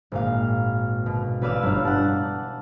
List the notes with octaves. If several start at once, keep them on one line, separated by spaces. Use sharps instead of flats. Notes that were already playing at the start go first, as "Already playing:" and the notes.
G#1 A#2 F5
B2
A1 B4 D5 F5 E6
G1 D4
F#5 A5